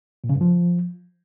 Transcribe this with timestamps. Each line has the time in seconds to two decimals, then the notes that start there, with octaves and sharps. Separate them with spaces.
0.24 A#2
0.29 C#3
0.35 G2
0.41 F3